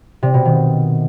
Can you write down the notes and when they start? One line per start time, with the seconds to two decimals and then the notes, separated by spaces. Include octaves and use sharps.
0.23 C3
0.34 B2
0.45 D#3